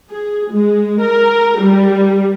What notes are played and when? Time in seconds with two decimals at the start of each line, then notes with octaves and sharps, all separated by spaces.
0.10 G#4
0.52 G#3
1.01 A#4
1.60 G3